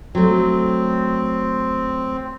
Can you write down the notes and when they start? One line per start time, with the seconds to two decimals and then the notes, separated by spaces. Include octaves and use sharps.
0.15 F#3 A3 C4